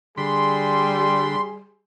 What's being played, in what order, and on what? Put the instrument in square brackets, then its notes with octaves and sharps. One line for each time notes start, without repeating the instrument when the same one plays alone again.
[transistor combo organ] D3 B5 [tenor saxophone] G3 [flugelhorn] G#4 [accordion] C6